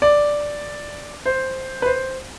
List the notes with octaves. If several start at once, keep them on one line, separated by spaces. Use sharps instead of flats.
D5
C5
B4
C5